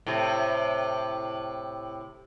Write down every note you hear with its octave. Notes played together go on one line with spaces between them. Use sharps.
A2 C3